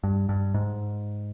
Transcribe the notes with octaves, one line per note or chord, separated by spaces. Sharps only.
G2
G2
G#2